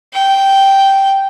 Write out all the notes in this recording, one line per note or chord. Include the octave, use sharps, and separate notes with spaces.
G5